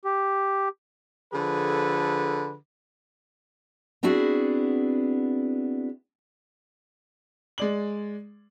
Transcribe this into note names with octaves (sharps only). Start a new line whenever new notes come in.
G4
D3 F3 G#4 A4 B4
B3 C4 D4 E4 F#4 G#4
G#3 D5 F#7